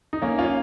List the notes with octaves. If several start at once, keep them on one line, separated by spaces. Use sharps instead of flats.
D#4
A#3 C#4
C#4 F4